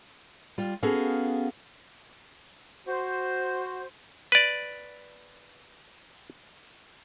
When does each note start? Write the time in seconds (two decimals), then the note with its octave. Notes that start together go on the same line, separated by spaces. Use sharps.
0.58 G3 F4
0.83 B3 C#4 F#4 G#4 A4 F5
2.87 F#4 C5
4.32 B4 D5